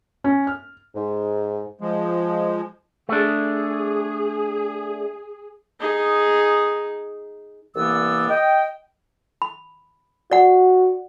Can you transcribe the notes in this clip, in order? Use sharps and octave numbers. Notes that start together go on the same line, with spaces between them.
C#4
F6
G#2
F3 G#3
A3 D4 G#4
D#4 G#4
C2 E3 A#3 B3 D5 E6
D#5 G5
B5
F#4 D5 F#5